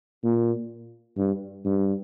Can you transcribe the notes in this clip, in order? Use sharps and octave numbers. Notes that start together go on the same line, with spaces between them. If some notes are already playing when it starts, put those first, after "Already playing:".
A#2
G2
G2